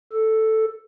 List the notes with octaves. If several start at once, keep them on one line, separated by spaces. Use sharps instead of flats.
A4